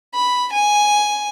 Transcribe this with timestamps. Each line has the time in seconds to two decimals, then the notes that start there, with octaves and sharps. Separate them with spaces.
0.14 B5
0.52 G#5